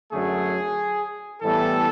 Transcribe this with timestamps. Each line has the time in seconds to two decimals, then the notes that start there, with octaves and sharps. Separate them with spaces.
0.11 F#2 D3 F#3 A3 G#4
1.41 A2 E3 G3 B3 A4